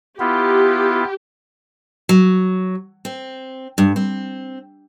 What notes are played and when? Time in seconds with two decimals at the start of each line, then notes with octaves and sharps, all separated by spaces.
0.20 B3 E4 F4 G4
2.09 F#3
3.05 C4
3.78 G2
3.96 C4